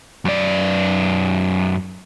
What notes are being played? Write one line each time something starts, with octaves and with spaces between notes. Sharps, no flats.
F#2 D5